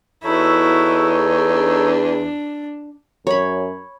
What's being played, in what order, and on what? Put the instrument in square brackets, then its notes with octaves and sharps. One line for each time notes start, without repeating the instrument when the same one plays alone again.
[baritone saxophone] E2 [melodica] D#4 A4 C#5 [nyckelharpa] E4 F#4
[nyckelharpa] D4
[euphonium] F#2 [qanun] C#5 B5